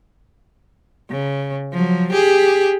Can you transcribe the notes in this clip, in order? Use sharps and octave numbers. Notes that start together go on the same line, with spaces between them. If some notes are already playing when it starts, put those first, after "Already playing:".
C#3
F3 F#3
G4 G#4